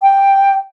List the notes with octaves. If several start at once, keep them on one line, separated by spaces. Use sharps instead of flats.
G5